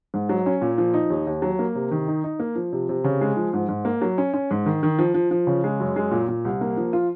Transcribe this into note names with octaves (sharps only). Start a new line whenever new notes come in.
G#2
F#3
C#4
A#2
F3
D#4
D#2
D#2
F#3
A#3
C3
D#3
D#4
D#4
A#3
F3
C3
C3
C#3
G#3
F3
G#2
G#2
A#3
F#3
C#4
C#4
G#2
D#3
D#3
F3
F3
F3
C#3
G#3
F#2
G#3
A#2
A#2
C2
A#3
F3
F4